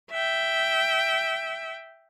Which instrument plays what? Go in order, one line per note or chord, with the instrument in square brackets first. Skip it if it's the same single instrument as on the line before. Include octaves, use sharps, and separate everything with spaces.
[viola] E5 G5